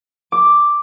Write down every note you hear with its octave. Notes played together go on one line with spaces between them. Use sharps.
D6